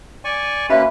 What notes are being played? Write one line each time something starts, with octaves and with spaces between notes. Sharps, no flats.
D5 G#5 C#6
A#3 C#4 F#4 B4 E5 B5